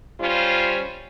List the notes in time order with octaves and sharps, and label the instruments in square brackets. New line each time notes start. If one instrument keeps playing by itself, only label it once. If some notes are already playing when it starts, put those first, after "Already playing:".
[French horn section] G3 C#4 F4 C5